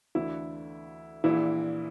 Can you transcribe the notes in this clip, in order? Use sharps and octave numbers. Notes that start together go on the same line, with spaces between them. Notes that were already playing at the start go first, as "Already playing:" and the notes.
D2 D3 E3 E4
A#1 A#2 E3 E4